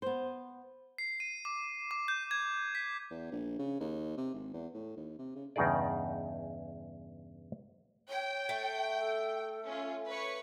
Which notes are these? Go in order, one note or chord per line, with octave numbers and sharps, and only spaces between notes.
B3 C5
C7
D#7
D6
D6
G6
G#6
B6
E2
A#1
C#3
D#2
C3
G#1
E2
A2
D#2
C3
C#3
E2 G2 C#3 D#4 G#4 D5
C#5 G5
A3
A4
C#4 F4
B4 C#5 C#6